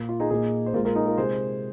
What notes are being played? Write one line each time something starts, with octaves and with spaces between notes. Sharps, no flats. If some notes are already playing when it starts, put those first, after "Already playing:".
Already playing: A#2 A#3
F4
D#4 G#4
A#2 A#3 D#4 G#4
C5
A#2 G#3 F4 A#4
F4 A#4
D#4 G#4
F4 A#4
C3 G#3 G#4 C5